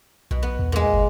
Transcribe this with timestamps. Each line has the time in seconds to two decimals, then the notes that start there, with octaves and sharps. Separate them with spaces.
0.31 B1 B2
0.43 B3
0.59 E2
0.72 A#2 G#3
0.93 G1